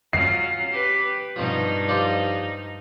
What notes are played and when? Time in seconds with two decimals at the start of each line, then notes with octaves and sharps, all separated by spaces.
0.13 F#3 C#4 F4 C7
0.70 G4 B4
1.36 G2 B2 F3 D#4
1.88 F3 G4 D5